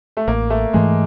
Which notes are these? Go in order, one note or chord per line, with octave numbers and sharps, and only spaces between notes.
A3
A1 A#3
A3
G#2 E3 G#3 A3